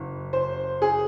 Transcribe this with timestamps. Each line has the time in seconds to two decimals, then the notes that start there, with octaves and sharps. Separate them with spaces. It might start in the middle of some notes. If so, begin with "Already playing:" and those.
Already playing: F#1
0.33 C5
0.82 G#4